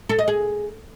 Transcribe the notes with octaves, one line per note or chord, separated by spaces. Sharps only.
A4
D#5
G#4